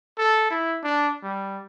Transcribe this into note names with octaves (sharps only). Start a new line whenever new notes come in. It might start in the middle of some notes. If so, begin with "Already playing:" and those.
A4
E4
D4
G3